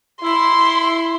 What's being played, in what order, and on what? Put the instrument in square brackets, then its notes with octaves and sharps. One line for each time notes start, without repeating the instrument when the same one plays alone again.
[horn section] E4 [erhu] C6